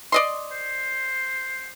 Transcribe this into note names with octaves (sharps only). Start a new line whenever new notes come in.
D5 D#5 C6
C5